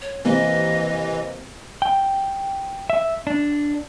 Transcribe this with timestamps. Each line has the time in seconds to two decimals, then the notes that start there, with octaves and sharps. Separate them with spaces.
0.01 C#5
0.25 C3 E3 A#3 C4 D#5
1.82 G5
2.90 E5
3.27 D4